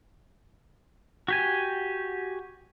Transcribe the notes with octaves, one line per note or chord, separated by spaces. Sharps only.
F#4 G4 G#5